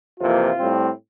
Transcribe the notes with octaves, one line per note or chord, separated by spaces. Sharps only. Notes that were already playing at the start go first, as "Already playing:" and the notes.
F2 C3 E3 A#3 F4
A2 G3 C4